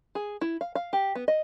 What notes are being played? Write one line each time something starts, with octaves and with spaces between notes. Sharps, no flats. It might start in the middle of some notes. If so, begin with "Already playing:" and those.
G#4
E4
F5
F5
G4
B3
D#5